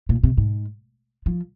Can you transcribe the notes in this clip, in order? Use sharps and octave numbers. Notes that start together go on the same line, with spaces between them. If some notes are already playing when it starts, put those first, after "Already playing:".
A#2
C3
G#2
F3